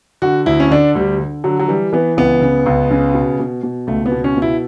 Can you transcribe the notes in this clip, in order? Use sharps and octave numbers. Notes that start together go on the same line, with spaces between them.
D3 F#4
D2 E4
C#4
D3 D4
D2 G3
D3
D3 F#3
F#3
E3 G3
E3 B3
C#2 B3
C#3
C#2
C#3
B2
B2
B2
C#2 A3
B3
B2
C#4
B2
E4